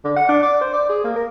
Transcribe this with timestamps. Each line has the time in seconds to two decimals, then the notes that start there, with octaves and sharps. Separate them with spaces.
0.04 D3
0.16 F#5
0.28 D4
0.43 D5
0.61 C5
0.73 D5
0.89 G#4
1.04 A#3
1.16 A#4